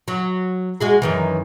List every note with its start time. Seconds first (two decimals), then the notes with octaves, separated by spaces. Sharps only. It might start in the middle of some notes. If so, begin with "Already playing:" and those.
0.08 F#3
0.80 G#3 F#4 G#4
1.02 F#2 D#3 E3